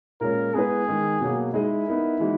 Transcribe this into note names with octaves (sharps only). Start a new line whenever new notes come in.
A#2 G#3 C#4 A#4
G#3 B3 E4 G#4 B4
D#3 G#3 D#4 A#4
B2 F#3 A#3
G#3 D#4 E4 G#4 D#5
B3 D#4 A#4
E3 G#3 D#4 F#4